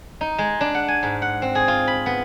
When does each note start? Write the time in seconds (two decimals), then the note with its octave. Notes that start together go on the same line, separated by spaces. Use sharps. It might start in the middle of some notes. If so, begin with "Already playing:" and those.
0.21 D#4
0.38 G#3
0.61 D4
0.74 F#5
0.88 G#5
1.03 G#2
1.22 F#5
1.42 C4
1.55 G#4
1.68 F4
1.87 B5
2.06 B3